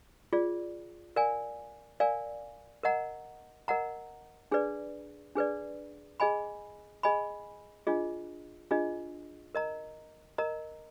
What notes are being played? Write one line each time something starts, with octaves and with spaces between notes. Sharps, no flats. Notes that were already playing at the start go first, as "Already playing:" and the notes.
F4 G#4 D5
A#4 D5 F5 G#5
A#4 D5 F5 G#5
A#4 D#5 F#5 A#5
A#4 D#5 F#5 A#5
D4 G#4 B4 D5
D4 G#4 B4 D5
G#4 D#5 G#5 B5
G#4 D#5 G#5 B5
D4 F4 G#4 D#5
D4 F4 G#4 D#5
A#4 D#5 A#5
A#4 D#5 A#5